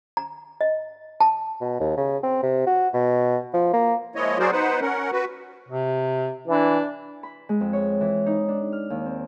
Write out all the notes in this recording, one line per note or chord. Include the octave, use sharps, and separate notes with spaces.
A#5
D#5
A5
B2
D#2
C#3
C4
C3
F#4
B2
F3
A#3
F3 G#3 A#3 E4 C#5 D#5
F#3 F#4 G#4 A#4 C5 D5
B3 D#4 B4 C5 F#5
C#4 A#4 F#5
F#4 B4
C3
E3 D4
B5
G#3
F2
C#5
E3
D#4
D4
F6
D#2
C4